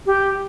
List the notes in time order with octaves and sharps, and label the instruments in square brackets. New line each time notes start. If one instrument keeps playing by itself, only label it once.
[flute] G4